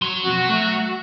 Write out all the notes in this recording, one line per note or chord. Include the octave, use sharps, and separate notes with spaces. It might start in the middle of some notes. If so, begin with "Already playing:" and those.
F#3 C#5 C6
F2 B2 F#4
A3 A4 E5